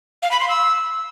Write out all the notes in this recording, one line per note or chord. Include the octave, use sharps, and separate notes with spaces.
F5
B5
C6
E6